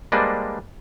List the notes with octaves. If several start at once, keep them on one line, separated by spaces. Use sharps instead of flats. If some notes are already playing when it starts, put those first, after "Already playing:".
G3 G#3 A#3 D4 B4 C5